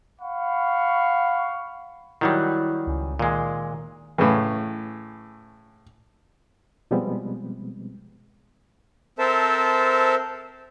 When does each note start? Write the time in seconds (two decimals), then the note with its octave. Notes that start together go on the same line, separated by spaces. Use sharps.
0.20 F5 F#5 B5 C#6
2.21 D#3 F#3 G3 E4 F#6
2.87 C#2 G#5
3.19 A#2 D#3 G#3
4.18 A2 C#3 E3
6.91 B2 F3 G3 G#3 B3 C4
9.19 C4 A4 A#4 C5 E5 A5